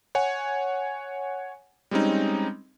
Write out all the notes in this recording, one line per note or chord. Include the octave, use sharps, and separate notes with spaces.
C#5 F#5 G#5
G3 G#3 C4 C#4 D#4